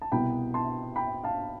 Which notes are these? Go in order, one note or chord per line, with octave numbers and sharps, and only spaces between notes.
A5
C2 B2 B3 G5 B5
A5 C6
G5 B5
F5 A5